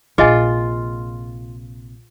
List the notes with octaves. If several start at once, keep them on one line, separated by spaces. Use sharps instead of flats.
A#1 C3 F4 G#4 D#5 G#5